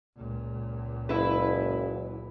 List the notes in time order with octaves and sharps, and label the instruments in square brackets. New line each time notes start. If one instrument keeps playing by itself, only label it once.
[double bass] C#2 A#2
[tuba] F#1 [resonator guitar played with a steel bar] E4 B4